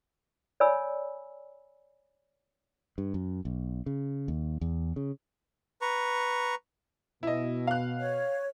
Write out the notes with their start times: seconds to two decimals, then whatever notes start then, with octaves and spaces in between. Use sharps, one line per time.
0.60 C#5 D5 G#5 B5 E6
2.98 G2
3.14 F#2
3.45 B1
3.86 C#3
4.28 D#2
4.61 E2
4.96 C#3
5.81 B4 A#5 C#6
7.23 B2 E4 D#5
7.67 F5 F#6
7.99 C#5